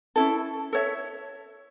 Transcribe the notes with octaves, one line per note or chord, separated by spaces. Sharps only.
C#4 E4 A4
A4 C#5 E5